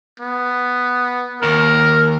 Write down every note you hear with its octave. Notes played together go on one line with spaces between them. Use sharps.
B3
D#2 A#4